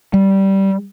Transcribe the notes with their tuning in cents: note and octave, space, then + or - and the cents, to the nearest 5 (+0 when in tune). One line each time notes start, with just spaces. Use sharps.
G3 -15